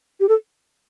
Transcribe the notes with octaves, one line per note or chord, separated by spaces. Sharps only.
G4
A4